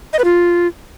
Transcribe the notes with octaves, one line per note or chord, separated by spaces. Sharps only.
D#5
B4
F4